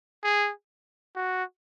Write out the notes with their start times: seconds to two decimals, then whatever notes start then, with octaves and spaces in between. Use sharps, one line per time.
0.24 G#4
1.16 F#4